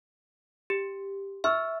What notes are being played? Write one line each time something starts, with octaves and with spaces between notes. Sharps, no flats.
G4
E5 C#6 E6 F6